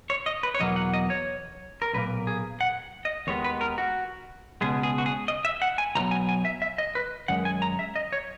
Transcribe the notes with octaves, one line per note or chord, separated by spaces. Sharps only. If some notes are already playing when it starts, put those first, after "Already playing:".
C#5
D#5
B4
C#5
E2 B2 F#3 A#3 D#5
F#5
D#5
C#5
A#4
B1 A#2 A#3 B4
G#4
F#5
D#5
D#2 D#3 G#3 B3 C#5
B4
A#4
F#4
C#2 B2 G#3 B3 G#4
G#4
F#4
G#4
D#5
E5
F#5
G#5
C#2 B2 F#3 A#5
G#5
G#5
E5
E5
D#5
B4
F#2 D#3 G#3 F#5
G#5
A#5
E5
D#5
C#5